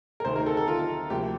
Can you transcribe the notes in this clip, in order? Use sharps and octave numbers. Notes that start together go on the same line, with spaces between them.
A#4
D2 C3 D#3 C5
A#4
A4
A4
F4
D2 C3 F3 A#3 G4